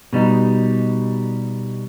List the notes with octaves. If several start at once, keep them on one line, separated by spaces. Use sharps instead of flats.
B2 G3 D#4